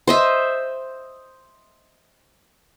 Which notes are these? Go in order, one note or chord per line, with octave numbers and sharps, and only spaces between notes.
C5 D#5 E5